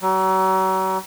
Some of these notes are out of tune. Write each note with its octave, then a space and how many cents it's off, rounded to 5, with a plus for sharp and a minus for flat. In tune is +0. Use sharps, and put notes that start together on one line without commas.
F#3 +40